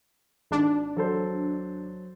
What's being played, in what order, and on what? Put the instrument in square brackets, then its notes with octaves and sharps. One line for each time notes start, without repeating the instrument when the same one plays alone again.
[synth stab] G#1 D4
[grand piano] F#3 A4 C5